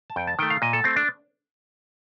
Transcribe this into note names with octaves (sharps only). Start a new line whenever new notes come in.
A5
F2 G5
A5
D#3 A3 G5
F5
A#2 D#5
A4
A3 C4
D4